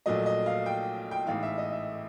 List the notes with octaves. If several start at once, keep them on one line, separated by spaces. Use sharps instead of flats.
A#1 A#2 F#3 A3 D#5
D#5
F5
G5
G5
A1 G#2 E3 F5
E5
D#5
E5